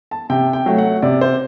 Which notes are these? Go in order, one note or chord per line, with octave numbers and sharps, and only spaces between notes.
A5
C3 G5
G5
F#3 A3
F#5
C3 D5
C5